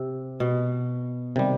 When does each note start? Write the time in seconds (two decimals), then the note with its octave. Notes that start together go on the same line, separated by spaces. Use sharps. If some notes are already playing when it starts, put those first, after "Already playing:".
Already playing: C3
0.40 B2
1.36 C3 D#3 G3